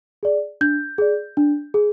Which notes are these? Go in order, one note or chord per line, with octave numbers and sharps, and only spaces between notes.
G#4 D5
D4 G6
G#4 D5
D4
G#4